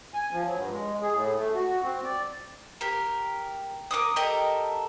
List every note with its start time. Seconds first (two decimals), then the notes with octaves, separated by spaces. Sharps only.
0.14 G#5
0.32 F3
0.44 F#3
0.56 G2
0.71 G#3
1.02 G#4
1.15 A2
1.36 A3
1.54 F#4
1.83 C4
2.04 D5
2.81 G4 A#4
3.91 A#4 D6 D#6
4.16 G4 A4 A#4 D#5